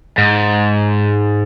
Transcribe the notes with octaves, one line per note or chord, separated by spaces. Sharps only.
G#2